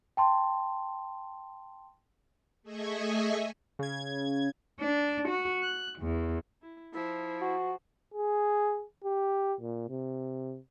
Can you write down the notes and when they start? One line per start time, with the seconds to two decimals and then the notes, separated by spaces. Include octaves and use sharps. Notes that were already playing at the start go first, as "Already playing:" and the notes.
0.17 G5 A5 C6
2.63 A3 G#4 D#5 E5 G#5 C#6
3.79 C#3 G#6
4.79 D4
5.27 F#4
5.61 F#6
5.99 E2
6.62 E4
6.93 F3 E4
7.41 F#4
8.14 G#4
9.04 G4
9.60 A#2
9.89 C3